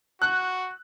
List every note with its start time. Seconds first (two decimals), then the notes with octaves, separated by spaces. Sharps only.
0.22 F#4 F#6